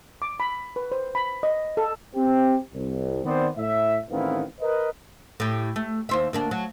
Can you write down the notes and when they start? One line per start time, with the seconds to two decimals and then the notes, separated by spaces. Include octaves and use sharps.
0.22 D6
0.40 B5
0.76 B4
0.92 C5
1.15 B5
1.43 D#5
1.77 A4
2.16 C4 G4
2.74 C2
3.25 D#3 B3 C4 C5 D5
3.57 A2 E5
4.11 A1 D#3 B3 C4 E4 F5
4.61 A#4 B4 D#5
5.40 A2 G4
5.76 A3
6.09 D#2 C5 E5
6.33 D2 A#3 D4
6.51 F#3